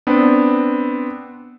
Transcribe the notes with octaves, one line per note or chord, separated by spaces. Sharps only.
B3 C4 D4